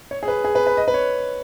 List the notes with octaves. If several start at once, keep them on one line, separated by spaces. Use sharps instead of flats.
C#5
G#4
B4
G#4
B4
B4
D#5
B4
C#5